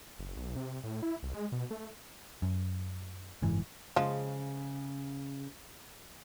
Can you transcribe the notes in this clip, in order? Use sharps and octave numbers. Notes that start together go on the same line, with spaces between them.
F#1
B1
C3
A2
E4
C2
G#3
B2
A3
F#2
F#1 G#2 E3
C#3 F3 G#3